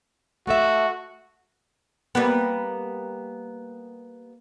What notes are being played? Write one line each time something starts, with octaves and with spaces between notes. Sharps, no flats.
A3 F#4 A4 E5
G3 A#3 B3